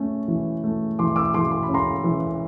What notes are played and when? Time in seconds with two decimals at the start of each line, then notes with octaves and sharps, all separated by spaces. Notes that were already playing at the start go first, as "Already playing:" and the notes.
Already playing: A3 C#4
0.28 E3
0.64 A3
0.99 E3 C6 D6
1.16 D6 E6
1.34 E3 C6 D6
1.51 C6
1.63 B5
1.69 C#4
1.74 A#5 C6
2.04 E3